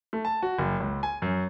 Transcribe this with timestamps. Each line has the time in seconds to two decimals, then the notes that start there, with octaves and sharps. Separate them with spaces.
0.13 A3
0.25 A5
0.42 F#4
0.59 F#1
0.80 C#2
1.03 G#5
1.22 F#2